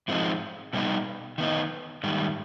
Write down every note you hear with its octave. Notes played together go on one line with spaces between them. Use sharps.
G#2 F3 G#3 C4 D#4
B2 G3 B3 D#4
D#3 B3 D#4
G#2 D#3 G3